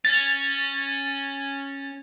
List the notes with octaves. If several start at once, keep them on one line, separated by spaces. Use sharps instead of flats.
C#4 A6